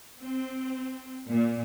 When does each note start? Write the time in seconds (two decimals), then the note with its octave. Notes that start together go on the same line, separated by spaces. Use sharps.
0.21 C4
1.26 A#2